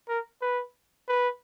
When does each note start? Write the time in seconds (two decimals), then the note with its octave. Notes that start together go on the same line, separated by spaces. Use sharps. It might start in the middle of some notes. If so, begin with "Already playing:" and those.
0.09 A#4
0.41 B4
1.08 B4